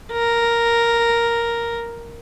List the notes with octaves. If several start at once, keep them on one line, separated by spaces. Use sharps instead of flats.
A#4